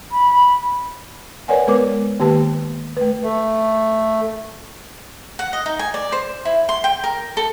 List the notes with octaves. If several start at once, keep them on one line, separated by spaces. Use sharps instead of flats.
B5
A#4 B4 C#5 D5 F#5 G#5
G#3 B3 A#4 B4 C#5 D6
D#3 A#3 G4 B4 A5
A3 B4
A3
F#5
D#5
D#4
G#5
D5
C5
E4
C6
G5
A#4
A4